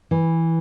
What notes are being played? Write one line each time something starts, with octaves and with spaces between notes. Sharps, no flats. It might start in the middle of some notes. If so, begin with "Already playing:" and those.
E3